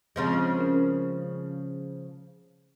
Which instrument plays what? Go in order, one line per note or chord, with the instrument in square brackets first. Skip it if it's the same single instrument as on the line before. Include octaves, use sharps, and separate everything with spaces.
[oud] C#3 F3 G#3 [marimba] C4 C6 G6
[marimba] C#4 A#4